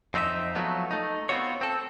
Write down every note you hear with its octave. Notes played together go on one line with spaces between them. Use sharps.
F2 C4 D#4 F#4 E5
F3 F#3 A3 B3
A3 D#4
B3 C4 D#4 F4 F#4 C#5
C4 A4